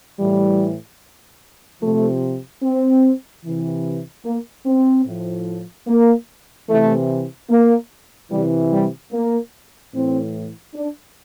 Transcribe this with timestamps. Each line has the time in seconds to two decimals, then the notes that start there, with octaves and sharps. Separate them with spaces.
0.19 A2 E3 G3
1.81 C3 F3 A3
2.63 C4
3.44 C3 E3
4.25 A#3
4.66 C4
5.06 A2 F3
5.87 A#3
6.69 C3 E3 A3
7.50 A#3
8.30 C3 E3 G3
8.72 G3
9.12 A#3
9.94 A2 E3 C4
10.75 D4